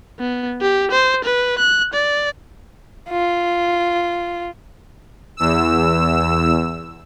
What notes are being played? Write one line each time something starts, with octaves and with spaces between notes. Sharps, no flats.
B3
G4
C5
B4
F#6
D5
F4
E2 E6